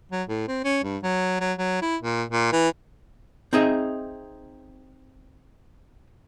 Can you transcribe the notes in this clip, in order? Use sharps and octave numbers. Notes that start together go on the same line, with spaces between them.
F#3
A2
C4
C#4
G2
F#3
F#3
F#3
E4
A#2
A#2
E3
C4 D#4 G#4 D#5 E5